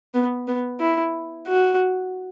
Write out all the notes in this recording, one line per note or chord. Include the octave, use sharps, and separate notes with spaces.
B3
B3
E4
F#4